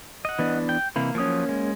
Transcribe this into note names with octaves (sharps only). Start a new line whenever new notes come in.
D#5 F#5
E3 B3 D4
G5
C3 E3 A#3 B4
F3 F#3 A#3 C#4 D#6
G#3